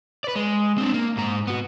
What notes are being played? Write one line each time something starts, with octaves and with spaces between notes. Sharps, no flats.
B4 D5
G#3
C4 D4
A#3
G#2 A#5
B3 F#4